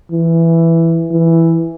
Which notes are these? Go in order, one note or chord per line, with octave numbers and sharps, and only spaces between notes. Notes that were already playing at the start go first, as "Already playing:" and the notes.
E3
E3